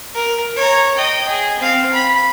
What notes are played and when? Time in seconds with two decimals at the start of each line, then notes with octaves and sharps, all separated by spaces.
0.15 A#4
0.56 C#5 A#5
0.97 D#5 G5
1.29 G#4
1.59 C4 F5
1.94 B5